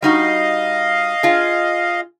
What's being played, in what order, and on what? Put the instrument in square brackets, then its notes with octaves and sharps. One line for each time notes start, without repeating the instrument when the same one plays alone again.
[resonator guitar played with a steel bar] G3 D#4 F#4 [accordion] D#5 F5
[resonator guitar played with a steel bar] F4 G#4